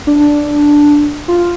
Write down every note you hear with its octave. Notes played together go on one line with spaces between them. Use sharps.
D4
F4